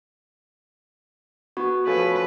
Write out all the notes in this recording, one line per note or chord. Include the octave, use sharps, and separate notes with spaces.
B3 F#4
F3 A3 C#4 B4